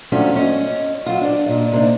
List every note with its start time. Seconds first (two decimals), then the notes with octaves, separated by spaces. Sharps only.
0.12 F3 F#3 A3 C#4 D4
0.36 C#4 C#5 D#5
1.06 F#3 F4
1.21 D4 D5
1.46 A#2 D#5
1.72 C3 A#3 D4 D#4